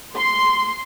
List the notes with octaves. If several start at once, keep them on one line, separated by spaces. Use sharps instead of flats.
C6